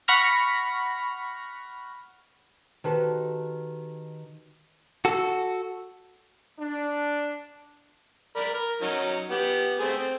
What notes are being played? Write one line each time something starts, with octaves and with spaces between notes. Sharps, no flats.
F#5 B5 C#6 F6 A#6
D#3 F#4 G4 A4 B4 C5
F#4 A4
D4
A#4 D5 B5
A#4
F#3 C#4 D#4
B3 G4
A3 C4 G#4
C4